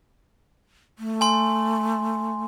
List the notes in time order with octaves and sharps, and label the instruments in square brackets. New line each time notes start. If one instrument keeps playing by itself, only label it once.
[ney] A3
[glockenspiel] G#5 C6